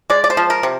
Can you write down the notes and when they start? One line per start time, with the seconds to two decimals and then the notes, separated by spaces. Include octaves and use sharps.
0.10 G#3 D5
0.24 D5
0.30 C5
0.37 F3
0.50 A#4
0.63 C3